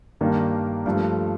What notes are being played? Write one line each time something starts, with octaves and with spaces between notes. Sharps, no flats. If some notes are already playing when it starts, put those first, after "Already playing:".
G2 D#3 A#3 D4
G2 F3 A3